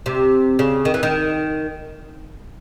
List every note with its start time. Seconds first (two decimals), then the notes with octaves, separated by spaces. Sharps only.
0.06 C3
0.59 C#3
0.85 D#3
0.94 E3
1.03 D#3